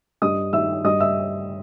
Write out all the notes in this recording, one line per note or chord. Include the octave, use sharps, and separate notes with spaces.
G2 D#5 D#6
D#3 E5 E6
G2 D#5 D#6
E5 E6